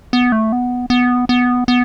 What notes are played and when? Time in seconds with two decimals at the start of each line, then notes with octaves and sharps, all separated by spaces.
0.13 B3
0.32 A3
0.52 B3
0.90 B3
1.29 B3
1.68 B3